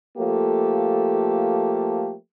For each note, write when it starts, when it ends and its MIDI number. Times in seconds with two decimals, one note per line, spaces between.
0.18 2.14 53
0.18 2.14 57
0.18 2.14 58
0.18 2.14 67
0.18 2.14 69